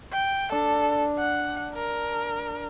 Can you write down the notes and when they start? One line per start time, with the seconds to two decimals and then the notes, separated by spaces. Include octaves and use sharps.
0.12 G5
0.52 D4 A4
1.19 F#5
1.74 A#4